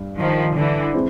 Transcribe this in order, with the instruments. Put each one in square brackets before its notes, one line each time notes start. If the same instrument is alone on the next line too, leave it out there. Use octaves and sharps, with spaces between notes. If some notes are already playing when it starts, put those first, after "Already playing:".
Already playing: [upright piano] G2
[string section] D#3 F3
D3 E3
[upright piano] G#3 C4 E4